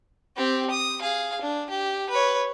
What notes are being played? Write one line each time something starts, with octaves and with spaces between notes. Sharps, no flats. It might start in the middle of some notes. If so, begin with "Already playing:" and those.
C4 G4
D#6
G#4 F5
D4
G4
B4 C#5